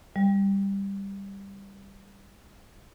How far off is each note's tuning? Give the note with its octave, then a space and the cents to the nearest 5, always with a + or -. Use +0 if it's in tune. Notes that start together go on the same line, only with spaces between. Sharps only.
G3 +10